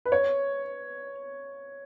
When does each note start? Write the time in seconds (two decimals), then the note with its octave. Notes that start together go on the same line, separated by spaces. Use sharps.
0.05 B4
0.12 C#5